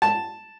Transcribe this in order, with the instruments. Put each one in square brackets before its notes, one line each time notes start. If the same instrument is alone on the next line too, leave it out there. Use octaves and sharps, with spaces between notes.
[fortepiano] A5